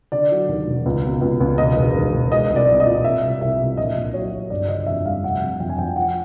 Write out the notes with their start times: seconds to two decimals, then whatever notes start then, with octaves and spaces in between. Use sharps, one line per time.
0.12 D3 D5
0.31 F#3
0.49 D#2
0.67 E1
0.86 C#2
1.04 B2
1.21 C#2
1.40 C#2
1.58 E1 D#5
1.76 E1
1.95 D#2
2.14 E1
2.31 G#3 D#5
2.50 C2
2.56 D5
2.69 C2
2.80 D#5
2.86 A#2
3.04 C2 E5
3.23 C2
3.41 C2 E5
3.60 C2
3.77 A#1 D#5
3.95 A#1
4.14 F#3 C#5
4.33 F#3
4.50 G1 D5
4.68 D3 D#5
4.86 F2 E5
5.05 G3 F5
5.23 F1 F#5
5.42 F2
5.60 F2 G5
5.69 G#5
5.78 F2 G5
5.96 F3 F#5